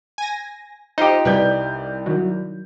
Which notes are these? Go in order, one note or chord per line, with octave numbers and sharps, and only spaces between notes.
G#5 A#6
D#4 F4 G4 C5 D#5
C2 B4 D5 G6
D#3 F#3